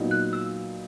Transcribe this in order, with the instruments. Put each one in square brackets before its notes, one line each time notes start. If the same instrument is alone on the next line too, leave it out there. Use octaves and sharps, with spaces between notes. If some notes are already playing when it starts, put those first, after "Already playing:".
Already playing: [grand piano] A#2 F#3 B3 D#4
[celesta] F#6
E6